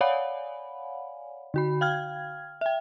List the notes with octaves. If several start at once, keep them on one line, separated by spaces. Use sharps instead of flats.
C#5 D5 F5 F#5 G#5 B5
D3 F#4 B5
F5 G5 F6 G#6
E5 G5